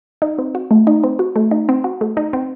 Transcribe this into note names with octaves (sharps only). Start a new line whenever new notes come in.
D#4
C4
F#4
A3
D#4
C4
F#4
A3
D#4
C4
F#4
A3
D#4
C4